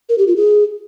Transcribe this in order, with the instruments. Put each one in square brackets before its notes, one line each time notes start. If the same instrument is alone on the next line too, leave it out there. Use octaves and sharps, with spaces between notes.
[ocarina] A#4
G4
F4
G#4